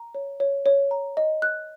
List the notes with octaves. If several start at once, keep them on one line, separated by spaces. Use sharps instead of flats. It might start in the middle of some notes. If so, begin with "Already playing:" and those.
Already playing: A#5
C#5
C#5
C#5
A#5
D#5
F#6